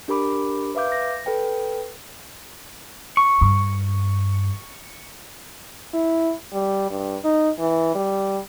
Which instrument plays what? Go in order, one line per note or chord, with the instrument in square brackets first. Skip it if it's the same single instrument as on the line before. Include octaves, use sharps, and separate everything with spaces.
[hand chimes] D4 G4 A#4 B5 D6
B4 E5 F5 D6 G6
A#6
A4 B4 G5
[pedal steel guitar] C#6
[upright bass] G2
[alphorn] E4
G3
G2
D#4
E3
G3